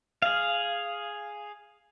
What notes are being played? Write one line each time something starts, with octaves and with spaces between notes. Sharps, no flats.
G#4 F5